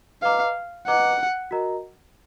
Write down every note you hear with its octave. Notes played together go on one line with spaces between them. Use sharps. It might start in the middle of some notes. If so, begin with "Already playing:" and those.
B4 D#5 F5 A#5 D6
B4 D#5 F#5 A#5 D6
F#4 A#4 D#5 A#5